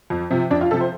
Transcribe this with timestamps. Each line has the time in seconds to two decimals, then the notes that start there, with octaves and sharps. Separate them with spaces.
0.10 F2
0.30 C3 F3
0.50 F2 D4
0.61 F4
0.71 C3 F3 A4
0.81 C5